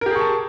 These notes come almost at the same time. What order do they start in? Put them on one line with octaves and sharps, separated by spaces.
A#4 G4 G#4 C#6 A5